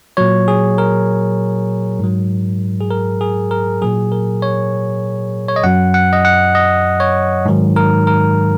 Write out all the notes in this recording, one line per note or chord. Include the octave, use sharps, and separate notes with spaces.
A#2 F#3 C#5
G#4
A#4
G#2 F#3
G#4
A#4
G#4
A#4
A#2 F#3 G#4
A#4
C#5
C#5
D#5
F#2 F#3 F#5
F#5
D#5
F#5
D#5
C#5
G#2 D#3 F#3
A#4
A#4